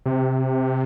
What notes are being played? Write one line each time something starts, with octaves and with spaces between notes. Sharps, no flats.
C3